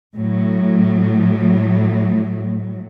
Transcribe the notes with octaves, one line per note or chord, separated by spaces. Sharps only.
A2 F#3